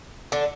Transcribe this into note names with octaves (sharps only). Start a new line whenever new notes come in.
D3 D4